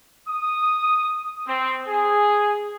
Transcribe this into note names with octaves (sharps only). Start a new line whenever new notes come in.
D#6
C4
G#4